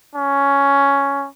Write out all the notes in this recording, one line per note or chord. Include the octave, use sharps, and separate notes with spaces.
C#4